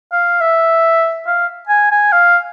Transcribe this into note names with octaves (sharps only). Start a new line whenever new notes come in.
F5
E5
F5
G#5
G#5
F5